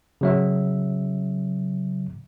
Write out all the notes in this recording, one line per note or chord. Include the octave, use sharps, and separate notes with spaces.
C#3 F#3 E5